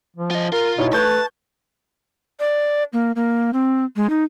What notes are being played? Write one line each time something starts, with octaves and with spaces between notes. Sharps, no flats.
F3
F4 D#5
F4 A#4
B2 D#4 E4 C#5
A3 B4 A5 C#6 G6 G#6
D5
A#3
A#3
C4
G#3
D#4